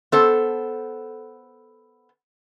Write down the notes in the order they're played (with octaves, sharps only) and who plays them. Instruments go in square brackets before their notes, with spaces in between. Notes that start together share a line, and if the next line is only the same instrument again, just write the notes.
[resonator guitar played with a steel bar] B3 A4 C5